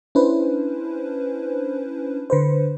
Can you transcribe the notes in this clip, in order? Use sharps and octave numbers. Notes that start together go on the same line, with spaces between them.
C#4 D4 E4 B4 C5
D3 B4 C5